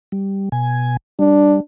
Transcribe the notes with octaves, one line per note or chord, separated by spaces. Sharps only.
G3
B2 G#5
G3 D4